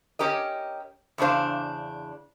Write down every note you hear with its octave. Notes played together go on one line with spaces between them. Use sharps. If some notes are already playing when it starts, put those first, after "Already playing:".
C#4 G4 A#4 D#5
E2 C#3 D4 C5 F5